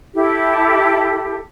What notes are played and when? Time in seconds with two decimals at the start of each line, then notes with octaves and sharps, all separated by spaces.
0.14 E4 G4 A4